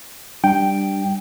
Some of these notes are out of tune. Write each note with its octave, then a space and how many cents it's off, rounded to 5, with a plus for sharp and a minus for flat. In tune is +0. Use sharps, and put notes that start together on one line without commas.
G3 +0 D4 +0 G5 +0